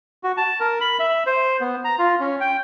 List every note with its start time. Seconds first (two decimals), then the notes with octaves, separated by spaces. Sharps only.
0.24 F#4
0.37 A5
0.60 A#4
0.81 B5
1.00 E5
1.26 C5
1.61 B3
1.84 A#5
1.99 F4
2.20 C#4
2.41 G5